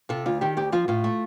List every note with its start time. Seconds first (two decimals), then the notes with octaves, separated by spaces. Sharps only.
0.09 C3 F4 A4
0.26 D2 F4
0.41 D#3 G4
0.57 D2 G4
0.72 F3 F4
0.88 A2 F4
1.04 A3